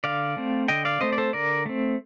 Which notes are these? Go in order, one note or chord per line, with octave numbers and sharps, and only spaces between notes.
D3 D5 F5
A3 C4
D3 D#5 G5
D5 F5
A3 C4 C5 D#5
D5
A4 C5
D3 A#4 D5
A3 C4